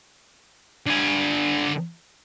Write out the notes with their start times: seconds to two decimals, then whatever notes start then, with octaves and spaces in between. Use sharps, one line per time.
0.86 D3 G#5